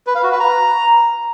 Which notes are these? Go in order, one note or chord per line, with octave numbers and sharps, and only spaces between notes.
B4
F5
F#4
B4
A#5